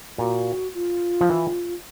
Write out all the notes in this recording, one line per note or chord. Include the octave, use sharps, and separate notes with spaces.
A#2 F#4
F4
F3
E3